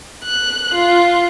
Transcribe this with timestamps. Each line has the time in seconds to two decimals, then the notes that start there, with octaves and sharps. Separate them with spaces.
0.25 F#6
0.74 F4